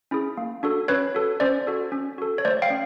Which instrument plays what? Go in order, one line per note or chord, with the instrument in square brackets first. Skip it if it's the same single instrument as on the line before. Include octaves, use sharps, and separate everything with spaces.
[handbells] C#4 E4 G#4
A#3
D4 F#4 A4
C#4 B4 C#5
F#4 A4
C#4 C5 D5
F#4 A4
C#4
F#4 A4
C#5
A3 C5 D5
F5 G5
C#4